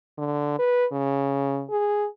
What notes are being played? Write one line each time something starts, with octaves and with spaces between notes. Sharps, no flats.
D3
B4
C#3
G#4